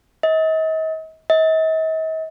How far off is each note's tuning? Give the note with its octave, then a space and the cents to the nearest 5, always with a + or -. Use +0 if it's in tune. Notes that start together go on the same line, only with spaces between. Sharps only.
D#5 +40
D#5 +45